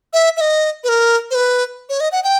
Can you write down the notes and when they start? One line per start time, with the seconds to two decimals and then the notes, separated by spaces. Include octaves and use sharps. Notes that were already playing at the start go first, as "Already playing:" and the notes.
0.13 E5
0.37 E5
0.41 D#5
0.84 B4
0.89 A#4
1.31 C5
1.35 B4
1.89 C#5
2.00 D#5
2.12 F#5
2.24 G5